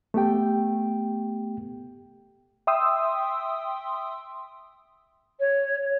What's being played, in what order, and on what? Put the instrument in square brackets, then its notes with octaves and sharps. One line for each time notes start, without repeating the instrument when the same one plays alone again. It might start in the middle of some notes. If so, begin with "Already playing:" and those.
[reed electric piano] A3 B3 G4 G5
[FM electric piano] E5 G5 C6 D#6 E6
[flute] C#5